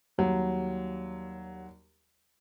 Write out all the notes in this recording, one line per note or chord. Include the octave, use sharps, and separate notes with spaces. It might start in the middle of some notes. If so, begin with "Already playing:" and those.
D#2 F#3 G3